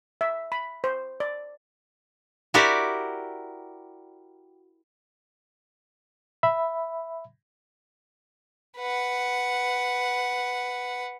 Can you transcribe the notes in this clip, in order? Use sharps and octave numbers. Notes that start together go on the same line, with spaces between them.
E5
B5
C5
D5
E4 F#4 G4 A#4 D5
E5 B5
B4 F#5